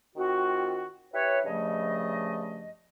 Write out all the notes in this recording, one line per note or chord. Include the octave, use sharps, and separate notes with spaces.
D#3 C4 F4 F#4
E4 G4 B4 C#5
G2 C#3 F3 A3 D#5